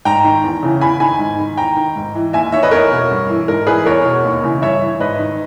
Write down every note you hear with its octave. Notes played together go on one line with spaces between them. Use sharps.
G#2 G5 A#5
D#3
E2
C#3 E3
E2 G#5 B5
D#3 G#5 B5
G#2
D#3
E2 G5 A#5
D#3
G#2
E3
D#2 E5 G#5
D#3 C#5 E5
B4 D#5
E2 A#4 C#5
B2
G2
E3
G#2 A#4
E3 G#4 B4
E2 A#4 C#5
B2
D#2
C#3 E3
G2 C#5 E5
E3
G#2 B4 D#5
D#3